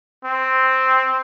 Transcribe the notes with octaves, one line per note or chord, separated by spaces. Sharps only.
C4